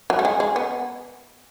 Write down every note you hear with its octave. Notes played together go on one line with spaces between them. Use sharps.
F#3
A3
G#3
G#3
B3